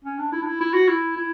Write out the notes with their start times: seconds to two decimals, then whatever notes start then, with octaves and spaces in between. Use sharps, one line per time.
0.04 C#4
0.19 D4
0.32 E4
0.42 D4
0.46 E4
0.61 E4
0.74 F#4
0.89 E4
1.17 E4